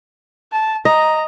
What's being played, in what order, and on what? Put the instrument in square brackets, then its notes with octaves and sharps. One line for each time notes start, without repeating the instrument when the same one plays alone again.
[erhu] A5
[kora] D#5 [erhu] A#5